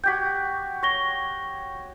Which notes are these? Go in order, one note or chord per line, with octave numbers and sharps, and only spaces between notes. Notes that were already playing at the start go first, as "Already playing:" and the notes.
F#4 G4 G5 G6 G#6 B6
C#5 C#6 A#6 G7